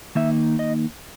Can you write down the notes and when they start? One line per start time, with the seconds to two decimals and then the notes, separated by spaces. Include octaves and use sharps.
0.15 D#3 A#3 D#4 E5
0.59 D#5